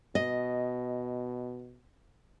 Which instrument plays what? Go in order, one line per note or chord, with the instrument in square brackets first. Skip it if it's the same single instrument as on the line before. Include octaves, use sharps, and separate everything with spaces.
[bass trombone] B2 [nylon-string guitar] D#5